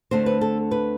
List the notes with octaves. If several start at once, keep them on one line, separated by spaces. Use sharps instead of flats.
D2 D3 A3 C4 C5
B4
A4
B4